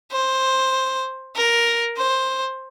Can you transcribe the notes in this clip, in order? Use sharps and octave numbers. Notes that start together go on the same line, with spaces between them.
C5
A#4
C5